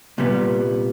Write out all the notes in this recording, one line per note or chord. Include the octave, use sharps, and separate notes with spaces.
C2 A#2 G3 B3